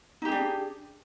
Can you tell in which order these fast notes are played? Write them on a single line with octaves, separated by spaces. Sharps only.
D#4 G4 G#4 D4